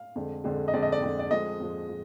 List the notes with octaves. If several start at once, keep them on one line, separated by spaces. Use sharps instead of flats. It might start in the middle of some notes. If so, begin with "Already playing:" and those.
Already playing: F5
F2 D3 G#3
F2 D3 G#3
D#5
F2 D3 G#3 D5
D#5
D5
F2 D3 G#3
D5
F2 F3 G#3 D#5
F2 F3 G#3
F3